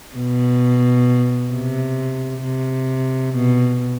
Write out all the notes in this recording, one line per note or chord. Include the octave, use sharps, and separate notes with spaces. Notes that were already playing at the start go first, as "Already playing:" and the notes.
B2
C3
C3
B2